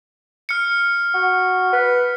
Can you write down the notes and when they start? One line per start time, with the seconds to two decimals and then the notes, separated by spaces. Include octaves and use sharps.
0.49 F6 C#7
1.14 F#4
1.73 B4